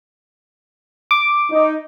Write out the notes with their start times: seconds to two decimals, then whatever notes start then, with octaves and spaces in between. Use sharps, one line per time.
1.11 D6
1.51 D#4